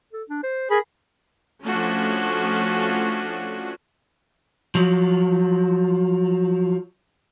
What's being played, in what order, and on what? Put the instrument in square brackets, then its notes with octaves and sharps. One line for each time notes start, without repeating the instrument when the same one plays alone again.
[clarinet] A4
D4
C5
[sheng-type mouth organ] G#4 B5 [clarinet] A#4
[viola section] F3 A3 C#4 D4 F4 F#4
[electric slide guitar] F3 F#3